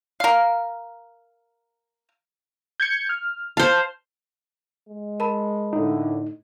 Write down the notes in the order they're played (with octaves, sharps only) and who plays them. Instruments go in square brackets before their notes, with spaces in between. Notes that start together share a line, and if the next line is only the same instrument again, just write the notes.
[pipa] A#4 F5
[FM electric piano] G6 G#6 C#7
F6
[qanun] C5 F5 [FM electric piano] A5
[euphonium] G#3
[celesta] A#4 A5 B5
[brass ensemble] A2 D3 [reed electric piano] D#4